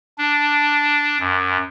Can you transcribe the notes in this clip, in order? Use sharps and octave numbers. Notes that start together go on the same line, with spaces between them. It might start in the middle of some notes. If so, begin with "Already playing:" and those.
D4
F#2